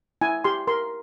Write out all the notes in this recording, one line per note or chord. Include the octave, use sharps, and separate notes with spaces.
E4 G#5
G4 C6
A#4 C6